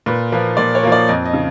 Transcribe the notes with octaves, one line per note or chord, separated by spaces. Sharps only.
A#2 B4
F3 A#3 B4
A#2 D5
C#5
F3 A#3
D5
F2 D#5
D#5
C#3